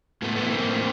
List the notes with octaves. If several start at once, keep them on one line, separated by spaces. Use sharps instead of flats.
A2 A3 B3
A3 B3
E3
A#3 C4
A2